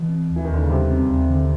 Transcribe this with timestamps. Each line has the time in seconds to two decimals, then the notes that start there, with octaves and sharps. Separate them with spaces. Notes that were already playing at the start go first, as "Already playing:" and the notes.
Already playing: B2 E3
0.09 C4
0.29 D#2
0.36 E3
0.45 D#3
0.49 D#2 D3
0.62 C#3
0.69 C3 G3
0.90 C4
1.10 D#2
1.30 D3